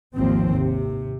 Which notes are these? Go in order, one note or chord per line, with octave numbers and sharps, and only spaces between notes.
G#1 D#2 F3 C4
C3